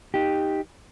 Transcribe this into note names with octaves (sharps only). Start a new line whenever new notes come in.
D#4 G4